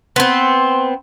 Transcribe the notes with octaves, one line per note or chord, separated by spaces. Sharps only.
B3 C4 C6